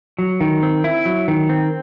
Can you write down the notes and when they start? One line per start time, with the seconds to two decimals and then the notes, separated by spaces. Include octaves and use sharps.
0.19 F#3
0.41 D#3
0.63 C4
0.84 E4
1.05 F#3
1.28 D#3
1.49 C4